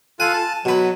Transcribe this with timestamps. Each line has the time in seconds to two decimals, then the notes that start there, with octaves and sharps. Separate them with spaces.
0.20 F4 A4 G#5 F#6
0.33 A5
0.65 B2 F#3 B4